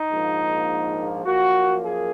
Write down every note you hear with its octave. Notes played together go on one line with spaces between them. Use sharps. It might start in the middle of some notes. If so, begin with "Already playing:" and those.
Already playing: D#4
A#1 G#2 F3 A#3
F#2 F3 A#3 F#4
G#4